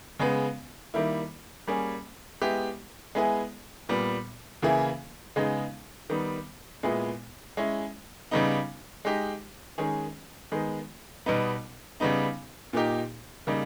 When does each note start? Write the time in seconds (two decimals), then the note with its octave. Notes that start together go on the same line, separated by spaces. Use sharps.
0.19 C#3 G#3 B3
0.94 D#3 G3 A#3 E4
1.67 G3 A#3 C#4 G#4
2.41 G#3 B3 E4 G4
3.15 G#3 B3 E4 G#4
3.89 A#2 G3 B3
4.62 C#3 E3 A#3 E4 G#4
5.36 C#3 G#3 B3 D#4 G#4
6.10 D#3 G3 B3
6.83 A#2 G#3 B3 E4 G#4
7.57 G#3 C#4 E4
8.31 C#3 G3 B3 D#4
9.05 G#3 D#4 G4
9.78 D#3 G#3 C#4 G#4
10.52 D#3 G#3 B3
11.26 B2 G3 B3 D#4
12.00 C#3 G3 B3 D#4
12.73 A#2 A#3 D#4 G4
13.47 C#3 G3 A#3 D#4